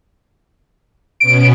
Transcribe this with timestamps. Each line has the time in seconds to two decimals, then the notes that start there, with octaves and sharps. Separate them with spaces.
1.20 B2 B3 C#4 D7